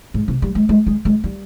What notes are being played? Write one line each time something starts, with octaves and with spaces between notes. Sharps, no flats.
G#2
C3
G3
G#3
G#3
G#3
G#3
G3